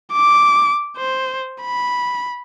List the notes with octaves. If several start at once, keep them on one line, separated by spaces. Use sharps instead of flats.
D6
C5
B5